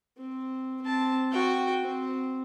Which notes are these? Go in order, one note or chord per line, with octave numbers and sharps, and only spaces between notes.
C4
C4 A5
F#4 G5
C4